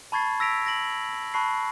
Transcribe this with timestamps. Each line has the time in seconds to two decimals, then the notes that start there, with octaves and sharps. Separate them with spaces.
0.12 A5 B5 C#6 G#6 A6 C7
0.40 E6 A#6 B6 D7 F7
0.66 A#6 D7 F#7
1.34 A5 B5 C#6 F#6 C7